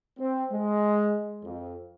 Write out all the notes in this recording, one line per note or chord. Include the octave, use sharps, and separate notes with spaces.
C4
G#3
F2